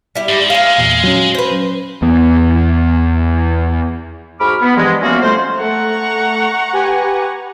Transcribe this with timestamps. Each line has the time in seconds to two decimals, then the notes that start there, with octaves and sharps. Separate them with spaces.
0.15 G3 E4 G4
0.29 G#2
0.50 G#3 F5 A#5
0.78 E2 A#2
1.04 F#3 C#4
1.35 B4 C5
2.02 E2 B3
4.40 G#2 F#4 B5 D6 F6
4.62 B3
4.76 G2 E3 F3 G#3
5.02 F#2 A#3 B3 C#4 F4 F#4
5.22 F2 G3 A3 C5
5.59 A3 F#5 A#5 C#6
6.73 G4 B4 G#5